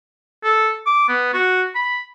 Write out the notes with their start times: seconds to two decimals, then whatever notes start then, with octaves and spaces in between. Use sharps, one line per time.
0.44 A4
0.86 D6
1.09 B3
1.34 F#4
1.75 B5